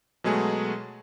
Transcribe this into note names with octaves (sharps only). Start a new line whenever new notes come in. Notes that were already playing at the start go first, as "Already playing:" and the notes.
B2 F#3 G#3 A3 G#4